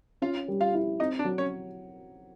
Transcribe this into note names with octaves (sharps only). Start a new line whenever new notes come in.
C#4 F4 F5
G3
F4 F5
E4
C4 D#4 D#5
D4 D5
F#3
C#4 C#5